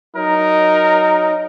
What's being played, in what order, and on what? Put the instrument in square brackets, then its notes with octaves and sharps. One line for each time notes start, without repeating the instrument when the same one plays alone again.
[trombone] F#3 [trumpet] D#4 [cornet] A#4